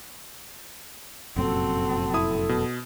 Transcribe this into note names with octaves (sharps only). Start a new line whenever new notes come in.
F1 F#2 A#2 C4 F#4 A4
E4 D#6
B2